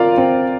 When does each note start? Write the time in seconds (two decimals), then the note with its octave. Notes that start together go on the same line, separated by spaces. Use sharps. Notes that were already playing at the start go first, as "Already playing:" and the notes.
Already playing: C4 F4 A#4 D5 F5
0.18 C4